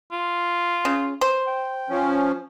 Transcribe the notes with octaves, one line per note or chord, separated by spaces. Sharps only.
F4
C#3
C5
G5
F3 C#4